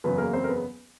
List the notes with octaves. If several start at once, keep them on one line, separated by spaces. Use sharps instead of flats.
F#1 E2 C#3 F#3 B3 B4
A#3 A#4
C4 C5
A#4
B3 B4